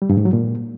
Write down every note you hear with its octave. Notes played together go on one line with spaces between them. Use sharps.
G3
G2
G#2
F#3
A#2